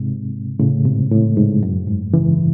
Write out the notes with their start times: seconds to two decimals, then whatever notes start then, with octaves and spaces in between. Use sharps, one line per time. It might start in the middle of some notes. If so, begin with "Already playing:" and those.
Already playing: G#2 C3
0.60 A2 C#3
0.85 G#2 C3
1.11 A2
1.37 G#2
1.63 F#2
1.87 G#2
2.13 C#3 E3